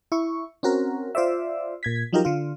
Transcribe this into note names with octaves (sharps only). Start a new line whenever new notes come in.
E4 C#6
C4 C#4 F#4 A#4
F4 C5 D5 E5
A#2 G#6 B6
F3 F#3 D#4 F4 G4 A#4
D3 F4